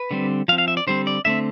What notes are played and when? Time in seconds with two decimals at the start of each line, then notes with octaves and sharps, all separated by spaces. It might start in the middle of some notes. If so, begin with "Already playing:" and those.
Already playing: B4
0.11 D3 G3 C4
0.48 F3 F5
0.52 C4
0.58 F5
0.68 E5
0.77 D5
0.87 D3 G3 C4 C5
1.07 D5
1.25 D3 A3 C4 E5